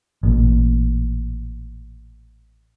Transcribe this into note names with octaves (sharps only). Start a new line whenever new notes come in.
A1 A#2